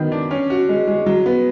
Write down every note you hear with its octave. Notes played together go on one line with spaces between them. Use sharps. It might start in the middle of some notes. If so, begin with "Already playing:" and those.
Already playing: D#3 F#3 B3
D4
C#4
F#4
G#3
G#3
F#3
B3